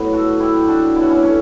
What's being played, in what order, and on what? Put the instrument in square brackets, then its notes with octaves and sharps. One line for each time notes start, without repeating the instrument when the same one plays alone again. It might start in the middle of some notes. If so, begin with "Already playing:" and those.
Already playing: [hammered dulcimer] A2 F#3 B3
F#4 A4
E4 G4
D4 F#4
B2 F#3 E4
F#4
C#4 E4
A3 C#4